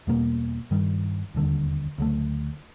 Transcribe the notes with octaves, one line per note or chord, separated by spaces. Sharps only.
E2 B2 G3 A#3
G2 D#3 G3
E1 D#2 D3 G3
D2 C#3 F#3 A3